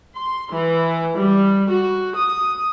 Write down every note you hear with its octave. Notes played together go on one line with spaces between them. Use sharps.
C6
E3
G3
F#4
D#6